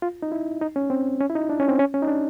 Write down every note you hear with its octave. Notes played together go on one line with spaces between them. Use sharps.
F4
D#4
E4
D#4
C#4
C4
C#4
E4
D#4
D4
C#4
C4
C#4
C#4
D#4
D4